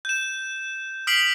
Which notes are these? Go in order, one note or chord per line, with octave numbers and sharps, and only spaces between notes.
G6 E7
D#6 F6 B6 C7 D7 F#7